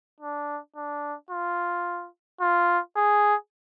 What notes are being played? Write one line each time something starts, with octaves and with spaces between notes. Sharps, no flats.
D4
D4
F4
F4
G#4